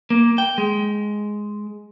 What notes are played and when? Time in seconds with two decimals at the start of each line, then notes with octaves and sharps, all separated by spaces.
0.10 A#3
0.38 G5
0.58 G#3